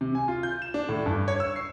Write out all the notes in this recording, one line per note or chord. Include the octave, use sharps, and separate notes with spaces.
C3
G#5
F4
G6
E7
D4
A2
G2
C#5
E6
C7